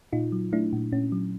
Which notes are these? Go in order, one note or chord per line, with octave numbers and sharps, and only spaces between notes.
A#2 D#4 F4
F#3
A3 D4 E4
A#2
A#2 C#4
F#3